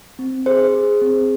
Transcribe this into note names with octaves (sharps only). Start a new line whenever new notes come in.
C4
G#4 C5
G#4
C4